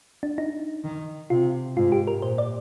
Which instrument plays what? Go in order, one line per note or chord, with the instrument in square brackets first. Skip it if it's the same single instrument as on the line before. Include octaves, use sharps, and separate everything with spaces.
[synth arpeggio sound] D4
D#4
[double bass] D#3
[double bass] C3 [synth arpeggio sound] F4
[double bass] G#2 [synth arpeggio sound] F4
[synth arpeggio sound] G4
A#4
[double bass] A#2 [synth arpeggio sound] C5
[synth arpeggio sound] D5